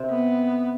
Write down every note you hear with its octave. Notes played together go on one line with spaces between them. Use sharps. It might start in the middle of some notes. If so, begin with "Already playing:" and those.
Already playing: C3 C4
B3